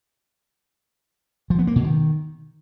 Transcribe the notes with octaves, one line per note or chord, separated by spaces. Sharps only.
F3
B3
A#3
B2
D#3